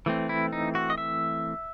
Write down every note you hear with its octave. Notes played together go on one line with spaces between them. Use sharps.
E3 A3 C4
E4
D#4
F#4
D#5
E5